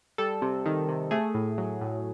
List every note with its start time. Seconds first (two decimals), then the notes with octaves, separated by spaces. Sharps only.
0.18 G3 A4
0.42 C3
0.66 D#3
0.89 C3
1.11 A3 G#4
1.34 A2
1.58 F#3
1.81 A2